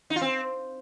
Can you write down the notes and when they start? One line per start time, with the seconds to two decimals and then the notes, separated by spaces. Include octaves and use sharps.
0.10 D#4
0.16 F4
0.21 C4